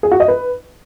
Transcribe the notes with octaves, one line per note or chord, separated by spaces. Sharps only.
G#4
F#4
D#5
B4